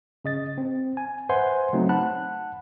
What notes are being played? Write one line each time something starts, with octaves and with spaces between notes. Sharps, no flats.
C#3 D#5 A6
C4
G#5
B4 C5 E5 F#5 G#5 C6
C#3 F#3 A3 C4 D#4
F#5 A5 B5 F#6